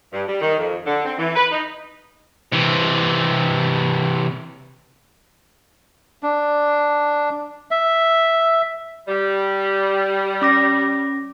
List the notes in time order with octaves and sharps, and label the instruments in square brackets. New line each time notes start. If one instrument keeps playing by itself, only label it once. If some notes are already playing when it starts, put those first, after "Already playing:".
[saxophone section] G2
G3
D#3
F2
D3
C4
E3
B4
D#4
[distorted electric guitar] C3 E3
[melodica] D4
E5
[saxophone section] G3
[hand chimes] C#4 D6 A#6